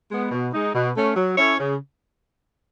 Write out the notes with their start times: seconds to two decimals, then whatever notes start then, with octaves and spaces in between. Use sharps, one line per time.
0.11 G#3 B3
0.31 B2
0.52 G#3 D#4
0.73 B2
0.95 A3 C#4
1.15 F#3
1.37 C#4 E4 A4 C#5
1.57 C#3